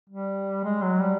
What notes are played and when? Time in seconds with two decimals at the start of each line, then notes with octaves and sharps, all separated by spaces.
0.10 G3
0.65 G#3
0.82 F#3
1.00 G3